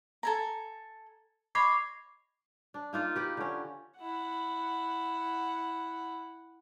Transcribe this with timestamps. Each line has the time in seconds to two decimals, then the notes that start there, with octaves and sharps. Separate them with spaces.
0.23 A4 G#5 A#5
1.55 C#5 D#5 B5 D6 G#6 C7
2.74 D4
2.93 A#3 D#4 F4 A#4
3.15 G4 B4
3.37 D3 C#4
3.97 E4 F#5